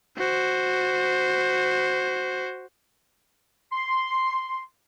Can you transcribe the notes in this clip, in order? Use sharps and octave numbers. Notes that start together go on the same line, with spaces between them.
F#4 C5
C6